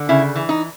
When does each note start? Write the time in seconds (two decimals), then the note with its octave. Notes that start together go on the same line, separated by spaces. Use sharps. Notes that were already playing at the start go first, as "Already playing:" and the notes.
Already playing: D3
0.09 C#3 E4
0.35 E3
0.49 D#4